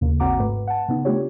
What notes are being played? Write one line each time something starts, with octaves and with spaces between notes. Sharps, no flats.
D#2 C#3 A#3
G#1 C4 F#4 F#5 A#5 D6
G#2 A3 B4
F#5 A5
C#3 B3 D#4
A3 D4 F4 G4 C#5